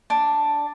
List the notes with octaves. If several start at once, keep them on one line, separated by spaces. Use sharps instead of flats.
D4